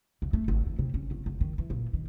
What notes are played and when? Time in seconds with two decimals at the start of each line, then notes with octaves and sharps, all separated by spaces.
0.22 C2
0.33 A3
0.48 G#1
0.66 E3
0.79 C3
0.94 C#4
1.11 G1
1.26 F1
1.41 D#3
1.58 E3
1.70 A#2
1.93 D#3